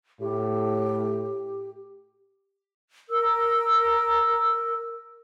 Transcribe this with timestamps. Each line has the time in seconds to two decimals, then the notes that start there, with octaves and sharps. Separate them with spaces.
0.20 A2 G4
3.10 A#4 E6